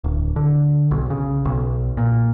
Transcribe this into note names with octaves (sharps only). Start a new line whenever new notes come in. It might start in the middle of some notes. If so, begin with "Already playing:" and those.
D1
D3
B1
C#3
B1
A#2